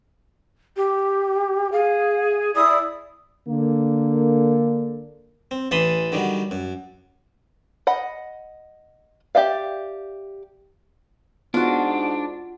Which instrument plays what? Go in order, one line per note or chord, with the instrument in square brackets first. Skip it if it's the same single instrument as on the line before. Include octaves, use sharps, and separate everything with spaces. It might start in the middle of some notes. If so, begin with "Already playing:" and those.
[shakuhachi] G4
[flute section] G#4 [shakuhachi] F5
[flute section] E4 D5 [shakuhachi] D#6
[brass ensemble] D3 A#3
[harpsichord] C4
A1 E3 A5 B5 C6 D#6
D3 D#3 F#3 G3
F#2
[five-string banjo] D#5 F#5 B5
G4 D5 E5 F5
[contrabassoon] G#2 [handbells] B3 [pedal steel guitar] D4 [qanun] F4 F#4